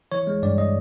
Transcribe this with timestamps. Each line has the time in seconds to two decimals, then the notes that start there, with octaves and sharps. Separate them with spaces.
0.12 E3 C#5
0.27 G#3
0.43 G2 D5
0.58 D#5